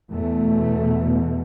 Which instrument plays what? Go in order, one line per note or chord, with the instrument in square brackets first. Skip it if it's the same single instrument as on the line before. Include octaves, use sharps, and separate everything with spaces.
[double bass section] E2 B2 A3